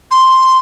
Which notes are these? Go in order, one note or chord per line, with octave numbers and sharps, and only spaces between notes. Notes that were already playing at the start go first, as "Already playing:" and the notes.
C6